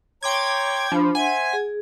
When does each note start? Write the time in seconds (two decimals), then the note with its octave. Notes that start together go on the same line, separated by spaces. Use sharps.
0.23 C#5 G5 A#5 C6 D6 G#6
0.92 F3 D4 C5 B5
1.15 C5 E5 F#5 G#5
1.53 G#4